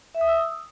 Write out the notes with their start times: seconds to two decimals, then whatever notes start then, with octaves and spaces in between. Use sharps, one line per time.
0.15 E5
0.21 D#6
0.28 E6